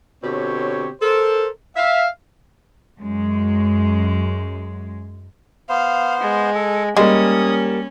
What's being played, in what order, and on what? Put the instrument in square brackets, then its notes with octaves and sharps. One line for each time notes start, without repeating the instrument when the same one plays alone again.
[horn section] B2 D3 C4 G4 C#5
A4 A#4 C5
E5 F5
[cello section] F#2 G#3
[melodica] B3 C5 [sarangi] F5
[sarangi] G#3
[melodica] A4
[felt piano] G3 A#3 [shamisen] G#3 [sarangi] C#4 [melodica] D#6